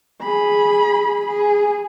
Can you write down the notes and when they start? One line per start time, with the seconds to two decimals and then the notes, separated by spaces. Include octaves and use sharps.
0.23 G#4 B5
1.26 G#4